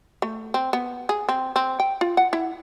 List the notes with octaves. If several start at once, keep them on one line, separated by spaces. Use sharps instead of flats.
A3
C4
B3
G#4
C4
C4
G5
F4
F#5
E4